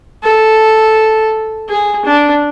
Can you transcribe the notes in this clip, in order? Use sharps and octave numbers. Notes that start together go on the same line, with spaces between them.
A4
G#4
D4